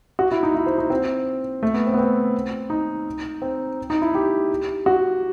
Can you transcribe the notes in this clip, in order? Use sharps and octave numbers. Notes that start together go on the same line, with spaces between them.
F#4
E4
D#4
E4
C5
D#4
C4
A3
B3
C4
B3
C4
D#4
C4
D#4
E4
G4
F#4